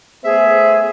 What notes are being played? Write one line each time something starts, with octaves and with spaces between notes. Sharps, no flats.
A3 B3 G#4 C5 E5